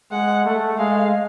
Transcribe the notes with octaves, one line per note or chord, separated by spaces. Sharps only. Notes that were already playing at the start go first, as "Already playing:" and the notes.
G#3 F#5
A3
G#3 F5